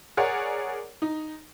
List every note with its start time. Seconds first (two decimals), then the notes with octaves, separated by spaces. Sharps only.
0.17 G#4 A#4 C#5 D5 F#5
1.02 D#4